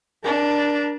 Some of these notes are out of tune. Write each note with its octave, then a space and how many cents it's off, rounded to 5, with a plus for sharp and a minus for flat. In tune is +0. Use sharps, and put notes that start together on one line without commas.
D4 +0 A#4 +30